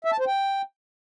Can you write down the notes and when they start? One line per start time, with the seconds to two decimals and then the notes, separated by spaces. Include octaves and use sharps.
0.05 E5
0.12 A5
0.19 C5
0.27 G5